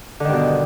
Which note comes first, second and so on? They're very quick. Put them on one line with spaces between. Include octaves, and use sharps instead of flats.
D3 D#3 G2 B2